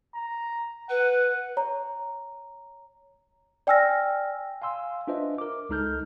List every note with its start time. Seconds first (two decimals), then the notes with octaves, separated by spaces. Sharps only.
0.15 A#5
0.89 B4 F#5
1.57 C#5 A#5
3.67 D5 G5 G#5 E6 F6 A#6
4.62 F5 G#5 C6 E6
5.07 D4 F4 B4 C5 D#5 E5
5.38 A#4 D6
5.69 C#2 G#3 D#4 A4 F6 G6